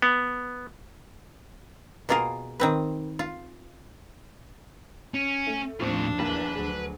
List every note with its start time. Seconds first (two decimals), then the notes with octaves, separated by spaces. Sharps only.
0.02 B3
2.09 B2 A#3 F4 G#4 A#4
2.60 D#3 C4 B4
3.19 F4
5.14 C#4
5.47 A3
5.80 D#2 A2 F3 C4 D4 F4 C#6 B6
6.19 B1 E2 A#3 B4
6.55 D2 F#3 G#4